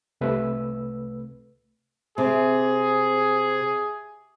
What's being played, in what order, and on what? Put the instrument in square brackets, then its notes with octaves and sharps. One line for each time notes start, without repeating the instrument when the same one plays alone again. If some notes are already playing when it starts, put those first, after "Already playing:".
[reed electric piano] C2 C3 A3 B4 E6
[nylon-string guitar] C3 [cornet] G#4